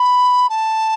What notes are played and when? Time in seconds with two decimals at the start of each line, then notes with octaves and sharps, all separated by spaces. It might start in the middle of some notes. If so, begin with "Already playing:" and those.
Already playing: B5
0.49 A5